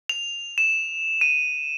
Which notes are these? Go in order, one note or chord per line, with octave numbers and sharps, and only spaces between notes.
F7
E7
D#7